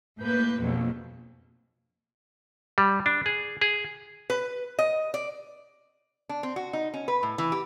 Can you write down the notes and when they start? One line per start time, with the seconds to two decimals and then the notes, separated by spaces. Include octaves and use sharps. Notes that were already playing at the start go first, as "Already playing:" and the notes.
0.18 A2 A#3 B4 G6
0.59 A#1 F2 B2 F#3
2.78 G3
3.06 D4
3.26 G#4
3.61 G#4
4.30 B4
4.79 D#5
5.14 D5
6.29 D4
6.43 C4
6.56 F#4
6.73 D#4
6.94 C#4
7.08 B4
7.23 A2
7.38 E3
7.52 G4